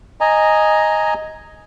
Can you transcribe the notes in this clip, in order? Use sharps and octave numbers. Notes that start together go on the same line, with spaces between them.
D#5 G#5 A#5